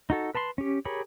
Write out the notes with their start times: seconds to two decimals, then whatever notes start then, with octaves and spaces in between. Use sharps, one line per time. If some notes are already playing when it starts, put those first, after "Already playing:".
0.10 D#4 F#4 A4
0.35 B4 A5 B5 C6
0.58 C#4 G4
0.85 G4 G#4 A#4 C#5 B5